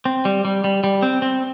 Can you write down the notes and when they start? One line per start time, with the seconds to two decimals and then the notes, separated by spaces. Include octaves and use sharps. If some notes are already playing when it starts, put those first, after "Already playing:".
0.05 C4
0.25 G3
0.45 G3
0.64 G3
0.84 G3
1.03 C4
1.22 C4